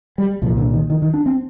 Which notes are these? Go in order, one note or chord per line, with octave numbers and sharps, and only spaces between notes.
G3
C2 A#2 F3
D3
D#3
D#3
D#3
D4
C4